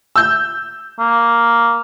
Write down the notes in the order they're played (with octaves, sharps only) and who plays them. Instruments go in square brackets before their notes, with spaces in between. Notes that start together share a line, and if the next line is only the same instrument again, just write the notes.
[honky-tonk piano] E6 G6
[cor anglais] A#3